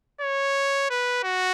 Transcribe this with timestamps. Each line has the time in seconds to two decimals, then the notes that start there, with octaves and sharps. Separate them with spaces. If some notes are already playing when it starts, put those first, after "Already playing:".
0.21 C#5
0.90 B4
1.24 F#4